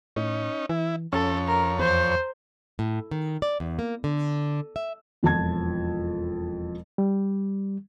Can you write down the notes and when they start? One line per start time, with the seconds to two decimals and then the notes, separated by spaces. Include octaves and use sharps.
0.16 A2 C#4 D#4
0.69 E3 E4
1.13 F2 C#4 A4 C#5
1.48 A#4
1.79 E2 C5
2.79 A2
3.11 D#3
3.42 D5
3.60 E2
3.79 A#3
4.04 D3
4.76 E5
5.23 E1 F2 F3 A5 G#6
6.98 G3